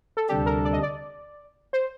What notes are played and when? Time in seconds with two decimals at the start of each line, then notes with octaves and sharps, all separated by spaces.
0.17 A4
0.29 D2 C3 G3 D4 G4 A4
0.46 A#4
0.65 D5
0.73 D#5
0.83 D5
1.73 C5